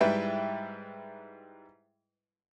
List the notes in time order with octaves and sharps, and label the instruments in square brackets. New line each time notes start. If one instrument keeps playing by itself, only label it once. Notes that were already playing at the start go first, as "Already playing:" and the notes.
[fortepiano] G#2 G3 E4 B4 E5 G5